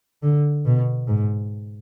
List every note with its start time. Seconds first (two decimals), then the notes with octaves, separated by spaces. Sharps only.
0.23 D3
0.66 B2
1.08 G#2